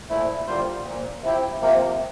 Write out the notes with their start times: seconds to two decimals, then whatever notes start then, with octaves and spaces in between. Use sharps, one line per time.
0.10 A#2 F3 A3 E4
0.47 D3 G3 A#3 F4 C5
0.85 A#2 F3 A#3
1.23 C3 F3 C4 E4 G4
1.61 C3 F3 A#3